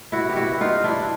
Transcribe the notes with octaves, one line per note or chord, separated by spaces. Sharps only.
G2 E4 F#4
G4
G2 E4 F#4
G2 D#4 F4
G2 D4 E4